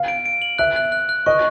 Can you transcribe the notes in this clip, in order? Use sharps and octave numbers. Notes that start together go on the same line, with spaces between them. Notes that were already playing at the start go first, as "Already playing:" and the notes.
Already playing: F5
D7
D7
F#7
E5 F#6
F#6
F#6
F#6
D#5 C#6